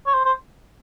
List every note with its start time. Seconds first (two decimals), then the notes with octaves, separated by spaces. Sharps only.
0.06 C#5
0.14 C5
0.25 C5